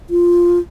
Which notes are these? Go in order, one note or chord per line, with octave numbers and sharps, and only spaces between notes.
F4